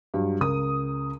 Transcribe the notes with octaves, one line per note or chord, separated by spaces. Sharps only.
G2 F#3
C#2 A#4 D#6